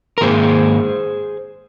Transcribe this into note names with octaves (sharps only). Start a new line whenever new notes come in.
A#4
G#2 D#3 A#3 G#4 C5